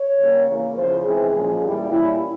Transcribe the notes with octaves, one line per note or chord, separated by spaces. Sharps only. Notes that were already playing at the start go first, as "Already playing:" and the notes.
Already playing: C#5
C#3 G3 A#3 C#4
C#3 E3 A#3 C#4
E2 C#3 F3 C5
C3 E3 G#3 C4 G#4
A#2 F3 G#3 C#4
E2 E3 G3 A#3
A#2 G3 C#4 E4